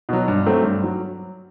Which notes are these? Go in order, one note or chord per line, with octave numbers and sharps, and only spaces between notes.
B2 F#3
G2
F#3 A3 C4
G2
F#3